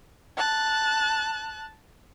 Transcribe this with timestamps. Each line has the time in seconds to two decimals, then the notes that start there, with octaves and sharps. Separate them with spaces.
0.37 A5 F#6